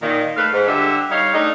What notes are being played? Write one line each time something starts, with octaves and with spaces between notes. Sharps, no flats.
A#2 D#3
A3 B4 F5
G#2
D3 G3 F4 G4 E5
G3 D#4 C#5 F5
A3 D4 D#4